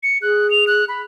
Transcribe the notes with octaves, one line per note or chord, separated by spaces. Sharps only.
C#7
G#4 F#6
F7
F#6
B5